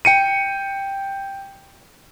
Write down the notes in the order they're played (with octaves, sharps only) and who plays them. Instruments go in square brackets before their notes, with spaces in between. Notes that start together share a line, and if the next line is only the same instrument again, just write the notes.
[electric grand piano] G5 C#7 D#7